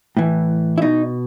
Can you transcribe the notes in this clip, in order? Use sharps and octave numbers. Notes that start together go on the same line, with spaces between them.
A2 E3
E4
B2 D#4